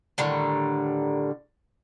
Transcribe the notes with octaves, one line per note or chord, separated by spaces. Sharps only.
A2 D3 D#3 G3